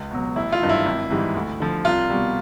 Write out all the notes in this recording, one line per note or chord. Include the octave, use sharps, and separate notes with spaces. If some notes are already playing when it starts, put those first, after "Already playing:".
Already playing: C#2
B2 F#3
A1 E4
F4
G2 D#3 F#3
E4
G#1
G#2 E3 G3
D2
D3 F3
C2 F4
B2 G3